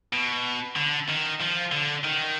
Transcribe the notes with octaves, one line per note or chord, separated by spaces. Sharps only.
B2
D3
D#3
F3
D3
D#3